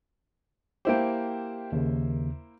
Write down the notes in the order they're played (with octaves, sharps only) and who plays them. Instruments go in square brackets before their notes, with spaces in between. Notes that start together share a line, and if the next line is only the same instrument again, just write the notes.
[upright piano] A#3 E4 C5 [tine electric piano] G4 G5
[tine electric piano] D#2 C#3